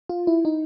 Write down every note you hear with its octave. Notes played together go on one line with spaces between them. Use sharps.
F4
E4
D#4